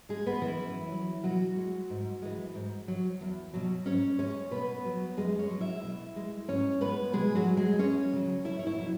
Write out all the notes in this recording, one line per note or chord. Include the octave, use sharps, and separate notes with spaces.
G#3 G#4
G#3 B3 B4
E3 E4
F#2
F#3
B2 F#3 F#4
G#3
G#2
E3 G#3
G#2
F#3
E2
B2 F#3
G#2 C#4 C#5
G#3 C#4 C#5
B2 B3 B4
F#3
F#2 G#3 G#4
C#4 C#5
F#3
E4 E5
B2
G#3
G#2 C#4 C#5
G#3 B3 B4
B2 G#3 G#4
F#3 F#4
F#3
G#3 G#4
E2 C#4 C#5
C#3 F#3
E2 E4 E5
C#5
E4 E5
B2 F#3